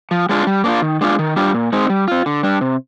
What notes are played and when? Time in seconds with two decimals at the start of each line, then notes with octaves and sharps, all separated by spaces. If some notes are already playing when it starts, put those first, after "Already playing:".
0.11 F3
0.29 G#3 D4 F4
0.47 G3
0.64 A#3 D4 F4
0.82 D#3
1.01 G#3 D4 F4
1.19 D#3
1.36 G3 D4 F4
1.54 A#2
1.73 G#3 C4 D#4
1.89 G3
2.08 C4 F4
2.26 D3
2.43 G3 D4
2.61 C3